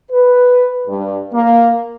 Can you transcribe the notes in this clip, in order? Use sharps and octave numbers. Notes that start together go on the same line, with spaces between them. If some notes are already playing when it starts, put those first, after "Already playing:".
B4
G2
A#3